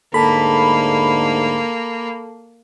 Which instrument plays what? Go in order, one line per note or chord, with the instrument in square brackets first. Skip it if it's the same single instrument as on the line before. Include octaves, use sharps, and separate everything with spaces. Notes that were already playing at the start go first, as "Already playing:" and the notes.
[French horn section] D2 G#2 D3 [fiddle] A#3 [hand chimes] A4 A5 [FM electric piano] B5